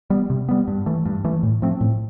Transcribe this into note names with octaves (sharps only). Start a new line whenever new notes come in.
G3 B3
C3
G3 B3
G2
E3 A3
G2
E3 A3
A2
F3 A3 C4
A2